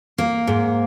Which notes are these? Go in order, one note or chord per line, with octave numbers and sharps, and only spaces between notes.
A#3
G#2